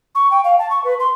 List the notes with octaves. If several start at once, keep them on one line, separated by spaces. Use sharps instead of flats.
C#6
G5
F5
A5
C#6
B4
C6